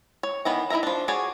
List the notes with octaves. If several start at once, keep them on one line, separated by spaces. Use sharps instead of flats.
C#5
D#3 E3 B3 A#5
D#4 E4 A#4 E5 A#5
F3 D4
F#4 G#4 C#5 D5